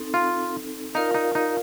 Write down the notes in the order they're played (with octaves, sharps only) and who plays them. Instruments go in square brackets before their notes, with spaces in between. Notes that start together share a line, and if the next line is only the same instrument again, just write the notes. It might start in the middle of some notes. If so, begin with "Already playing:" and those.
Already playing: [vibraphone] C4 D#4 A4
[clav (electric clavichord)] F4
[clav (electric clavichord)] D#4 [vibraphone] F4 A#4 D5 F5
[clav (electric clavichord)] D#4
D#4